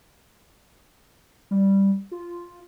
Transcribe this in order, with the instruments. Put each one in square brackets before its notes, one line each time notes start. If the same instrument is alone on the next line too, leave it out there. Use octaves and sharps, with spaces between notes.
[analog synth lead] G3
F4